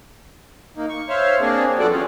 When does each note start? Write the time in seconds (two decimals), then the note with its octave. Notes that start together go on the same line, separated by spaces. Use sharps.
0.77 A#3 D#4
0.89 C#6
1.09 C5 C#5 E5 F5
1.40 A#3 C4 D4 G#4
1.79 F#2 F3 B3 F#4 A4 D5
1.91 C4 C#4 F4